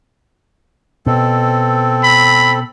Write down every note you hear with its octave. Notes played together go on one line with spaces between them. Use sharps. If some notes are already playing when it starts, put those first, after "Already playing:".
B2 C4 A4
B5